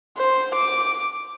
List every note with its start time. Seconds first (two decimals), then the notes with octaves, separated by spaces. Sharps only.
0.17 C5
0.55 D6